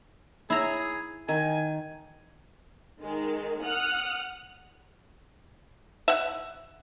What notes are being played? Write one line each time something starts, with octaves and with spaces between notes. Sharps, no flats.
E4 G#4 A#5
D#3 G#5
D#3 G#3
F#5 D#6 F6 F#6
E5 F#5